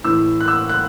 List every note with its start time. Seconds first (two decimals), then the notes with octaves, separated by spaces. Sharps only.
0.04 A2 E3 E6
0.41 F#6
0.48 E6
0.69 F#6